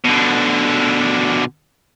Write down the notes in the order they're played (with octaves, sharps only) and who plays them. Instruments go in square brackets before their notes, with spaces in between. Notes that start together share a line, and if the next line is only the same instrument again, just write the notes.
[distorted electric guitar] B2 D3